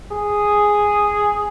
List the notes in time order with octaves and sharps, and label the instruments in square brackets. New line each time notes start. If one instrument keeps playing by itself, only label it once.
[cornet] G#4